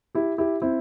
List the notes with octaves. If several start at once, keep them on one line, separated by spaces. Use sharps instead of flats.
E4 G4
E4 G4
C4 E4